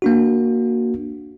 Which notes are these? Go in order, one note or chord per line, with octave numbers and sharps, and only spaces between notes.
A#3 D4 F#4